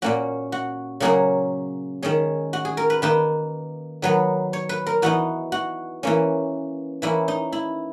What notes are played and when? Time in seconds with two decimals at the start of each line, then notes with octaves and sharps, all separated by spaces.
0.02 A#2 A#3 C#4 F#4
0.52 F#4
1.00 C#3 F#3 A#3 C#4 G#4
2.02 D#3 G#3 C#4 G#4
2.53 F#4
2.65 G#4
2.77 A#4
2.90 B4
3.02 D#3 A#3 D#4 B4
4.02 D#3 F#3 B3 B4
4.53 C#5
4.69 B4
4.87 A#4
5.02 E3 B3 D#4 F#4
5.52 F#4
6.03 E3 A#3 C#4
7.02 E3 A#3 C#4 E4
7.28 D#4
7.53 E4